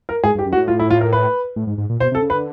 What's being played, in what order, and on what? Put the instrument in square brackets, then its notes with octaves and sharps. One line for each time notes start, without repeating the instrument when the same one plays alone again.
[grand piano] A#4
[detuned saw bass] G#2 [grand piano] G#4
[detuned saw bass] G2
[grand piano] G4
[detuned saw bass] F#2
[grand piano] F#4
[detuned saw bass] A2
[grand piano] F4
E4
F4
A#4
B4
[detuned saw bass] A2
G#2
G#2
A#2
[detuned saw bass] B2 [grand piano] C5
[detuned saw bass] C3
[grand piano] A4
[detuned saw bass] C#3
[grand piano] B4
[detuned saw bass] D3